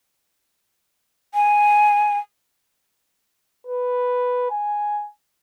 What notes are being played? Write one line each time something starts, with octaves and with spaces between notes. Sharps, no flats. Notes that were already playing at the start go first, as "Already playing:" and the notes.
G#5
B4
G#5